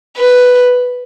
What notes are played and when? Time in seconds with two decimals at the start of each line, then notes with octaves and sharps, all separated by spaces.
0.18 B4